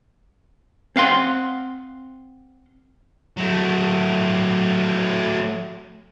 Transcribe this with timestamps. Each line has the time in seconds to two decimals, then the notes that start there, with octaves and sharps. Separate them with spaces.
0.96 C4 F5 F#5 C6
3.37 F#3 A3